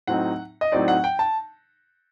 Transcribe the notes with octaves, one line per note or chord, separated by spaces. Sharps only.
A2 F#3 C4 D#4 F#5
D#5
A2 F#3 C4 D#4 D5
F#5
G5
A5